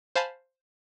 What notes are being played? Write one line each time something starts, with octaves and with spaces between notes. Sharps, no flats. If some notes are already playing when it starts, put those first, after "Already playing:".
C5 F5 G#5 A5 B5 C6